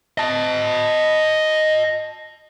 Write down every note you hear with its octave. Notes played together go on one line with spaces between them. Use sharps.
D#5 A5